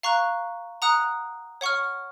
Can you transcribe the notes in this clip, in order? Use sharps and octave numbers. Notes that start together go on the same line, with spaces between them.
F5 A#5 C#6 F#6
F#5 A#5 D#6 F#6
C#5 F#5 C#6 F6